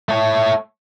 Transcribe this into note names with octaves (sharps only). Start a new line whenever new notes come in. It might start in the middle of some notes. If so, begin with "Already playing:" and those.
A3 C#5